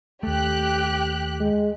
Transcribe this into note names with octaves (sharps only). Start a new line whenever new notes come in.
D#2 A3 G4 F#6
G#3